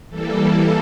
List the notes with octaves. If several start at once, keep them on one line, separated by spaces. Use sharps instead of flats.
E3 G3 A#3 A4